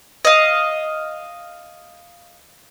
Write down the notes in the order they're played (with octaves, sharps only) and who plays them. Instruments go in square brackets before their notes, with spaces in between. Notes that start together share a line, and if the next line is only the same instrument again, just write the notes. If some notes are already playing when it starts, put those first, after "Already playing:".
[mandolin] D#5 F5